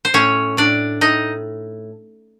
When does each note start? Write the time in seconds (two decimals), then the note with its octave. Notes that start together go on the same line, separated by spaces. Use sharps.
0.05 C5
0.14 A2 C#4 C#5
0.57 A2 D4 D5
1.01 A2 D#4 D#5